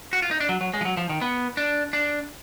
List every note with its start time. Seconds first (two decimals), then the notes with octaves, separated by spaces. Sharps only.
0.13 F#4
0.22 F4
0.31 D#4
0.40 D4
0.49 F#3
0.61 F#3
0.74 G#3
0.81 F3
0.85 F#3
0.97 F3
1.09 D#3
1.21 B3
1.57 D4
1.93 D4